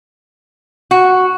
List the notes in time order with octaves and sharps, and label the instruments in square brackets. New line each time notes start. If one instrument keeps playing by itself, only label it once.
[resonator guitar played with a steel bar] F#4